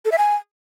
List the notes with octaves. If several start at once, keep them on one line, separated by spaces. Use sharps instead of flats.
A4
E5
G#5